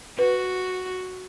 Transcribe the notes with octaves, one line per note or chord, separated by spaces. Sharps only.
F#4 B4